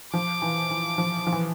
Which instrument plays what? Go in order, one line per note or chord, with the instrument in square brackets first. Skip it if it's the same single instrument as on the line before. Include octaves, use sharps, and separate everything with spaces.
[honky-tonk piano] F3 [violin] D6
[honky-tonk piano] E3
E3
F3
F3
E3